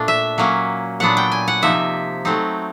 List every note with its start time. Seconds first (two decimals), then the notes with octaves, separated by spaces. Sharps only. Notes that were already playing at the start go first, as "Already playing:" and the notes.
Already playing: A#2 A3 D4
0.08 E5
0.38 F#3 A#3 C#4
1.00 A#2 F#3 B3 D4 F#5
1.17 G5
1.32 G#5
1.48 F#5
1.62 C3 F3 A#3 D#4 E5
2.25 F#3 A3 C4 D#4